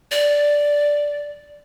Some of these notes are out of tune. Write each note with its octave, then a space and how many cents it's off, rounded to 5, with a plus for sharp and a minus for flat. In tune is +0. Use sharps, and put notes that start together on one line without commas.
D5 -5